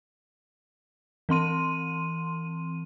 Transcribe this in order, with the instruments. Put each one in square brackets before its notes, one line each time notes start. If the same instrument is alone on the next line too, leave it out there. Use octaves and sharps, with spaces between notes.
[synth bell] E3 C4 C6 D#7